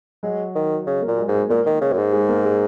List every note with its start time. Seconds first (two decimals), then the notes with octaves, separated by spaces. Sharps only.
0.23 F#3 G#3 F#4
0.55 D#3
0.87 C#3
1.02 A#3 A#4
1.08 A#2
1.18 G#3 G#4
1.28 G#2
1.34 G#3 G#4
1.49 A#2 A#3 A#4
1.66 D#3
1.81 C#3
1.93 F#2
1.97 G#2
2.12 G#3 G#4
2.28 A#3 A#4
2.44 G#3 G#4